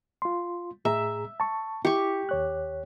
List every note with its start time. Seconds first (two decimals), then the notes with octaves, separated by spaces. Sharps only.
0.22 F4 C6
0.85 A2 G#4 E5 A#5
1.40 A5 C#6
1.85 E4 G4 C#6
2.29 D#2 C#5 F#6